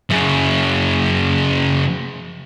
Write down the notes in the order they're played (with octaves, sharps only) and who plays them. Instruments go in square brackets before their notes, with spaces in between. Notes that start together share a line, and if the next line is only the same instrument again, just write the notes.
[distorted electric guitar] F#2 C#3